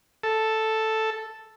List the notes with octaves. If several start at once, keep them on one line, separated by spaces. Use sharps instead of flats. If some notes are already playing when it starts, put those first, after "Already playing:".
A4